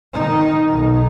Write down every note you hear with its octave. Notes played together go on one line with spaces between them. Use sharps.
D#3 D#4
B1 D#4